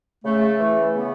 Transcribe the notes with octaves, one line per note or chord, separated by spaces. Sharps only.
C#3 A3
E3 A3
C#3 B3